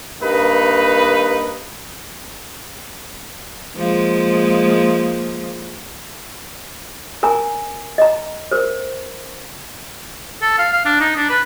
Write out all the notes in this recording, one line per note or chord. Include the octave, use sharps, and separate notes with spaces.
G2 A#3 D#4 B4
F3 G#3 A#3
A#4 G#5 A#5
D#5 A#5
A#4 C5
A4
F5
F5
D4
D#4
D4
B4